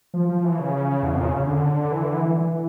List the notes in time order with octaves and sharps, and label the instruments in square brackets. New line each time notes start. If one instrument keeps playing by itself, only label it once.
[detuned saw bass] F3
F3
E3
C#3
E2
F2
A#2
C#3
C#3
D3
E3
D3
E3
E3
E3